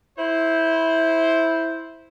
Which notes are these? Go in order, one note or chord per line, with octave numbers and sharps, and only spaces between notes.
E4 C5